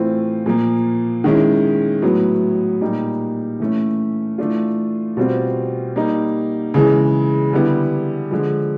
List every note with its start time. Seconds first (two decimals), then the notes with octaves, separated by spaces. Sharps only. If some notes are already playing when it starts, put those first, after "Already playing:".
Already playing: A2 E3 A3 C4 F4
0.46 A#2 F3 A#3
1.24 D#3 G#3 C#4 E4
2.02 A2 F#3 B3 E4
2.81 A#2 G3 A#3 D#4
3.60 E3 A3 C#4
4.38 E3 A3 D4 F4
5.17 B2 G3 C4 F4
5.96 G3 A#3 D#4
6.74 C#3 E3 G#3
7.53 D3 G3 B3 E4
8.31 D3 F3 G#3